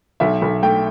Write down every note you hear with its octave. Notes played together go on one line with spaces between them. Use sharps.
B1 E5
B1
A3 G5